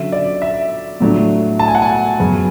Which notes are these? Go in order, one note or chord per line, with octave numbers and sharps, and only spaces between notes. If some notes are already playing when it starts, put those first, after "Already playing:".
Already playing: D3 F#3 C#4 E5
D5
E5
A2 F#3 A3 D4
A5
G#5
F#5
G#5
F#2 C#3 F#3 B3